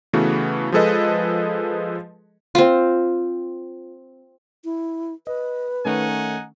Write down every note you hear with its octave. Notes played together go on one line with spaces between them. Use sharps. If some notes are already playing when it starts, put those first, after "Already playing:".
C#3 E3 A3 B3 F#4
F3 G#3 G#4 A4 B4 D#5
C4 F4
E4
B4 D#5
D#3 A3 C#4 D#4 F#5 G#5